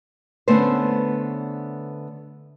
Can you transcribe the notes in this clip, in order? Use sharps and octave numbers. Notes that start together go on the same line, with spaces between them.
D3 A3 B3 C#4 B4 C5